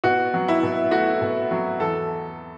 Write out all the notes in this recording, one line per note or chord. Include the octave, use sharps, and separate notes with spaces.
B2 F#4
F#3
E4
B2
A3 F#4
B2
F#3
E2 A4